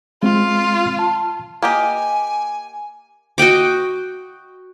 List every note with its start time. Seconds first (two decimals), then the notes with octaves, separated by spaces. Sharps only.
0.23 G#3 C4 F4
0.99 A5
1.62 A#3 G4 D#5 G#5
3.38 F#4 D#5 G5 D6